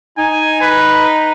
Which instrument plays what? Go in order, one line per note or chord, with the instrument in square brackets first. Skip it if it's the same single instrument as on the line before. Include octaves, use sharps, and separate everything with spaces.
[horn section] D#4 [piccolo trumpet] G#5
[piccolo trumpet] B4